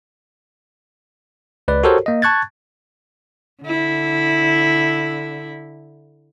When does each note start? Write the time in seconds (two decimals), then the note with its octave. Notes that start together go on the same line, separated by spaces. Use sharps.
1.68 C#2 B4 D5
1.84 F#4 G4 A4 A#4 C5 C#5
2.06 A#3 D#5
2.22 A5 C#6 F#6 G#6 A6
3.63 D3 E4